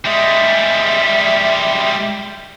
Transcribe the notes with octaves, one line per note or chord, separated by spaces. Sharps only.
G3 G#3 E5